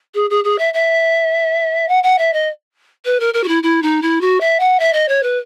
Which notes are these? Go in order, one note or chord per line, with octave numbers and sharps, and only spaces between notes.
G#4
G#4
G#4
E5
E5
F#5
F#5
E5
D#5
B4
A#4
A#4
F#4
E4
E4
D#4
E4
F#4
E5
F#5
E5
D#5
C#5
B4